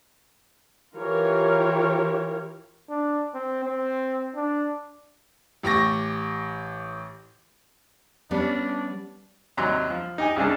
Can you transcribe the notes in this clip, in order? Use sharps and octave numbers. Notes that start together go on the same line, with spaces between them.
E3 F4 G4 A#4 C#5
D4
C4
C4
D4
A1 G4 C#6 A#6
G3 B3 C#4 D4
D#2 C3 F#3 G3 A#5 C6
F3
D#4 G4 G#5
C2 C#3 G#3 D4 D#4 A5